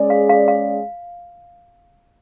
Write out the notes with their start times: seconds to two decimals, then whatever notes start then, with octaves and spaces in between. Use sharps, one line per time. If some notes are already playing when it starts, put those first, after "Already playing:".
Already playing: G#3 C#4 G#4 D5
0.10 F5
0.29 F5
0.48 F5